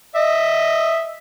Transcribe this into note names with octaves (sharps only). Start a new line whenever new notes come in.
D#5 E5